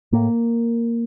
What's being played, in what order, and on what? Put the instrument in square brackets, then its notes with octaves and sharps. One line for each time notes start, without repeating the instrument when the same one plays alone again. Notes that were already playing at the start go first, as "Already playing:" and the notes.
[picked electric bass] A2 A#3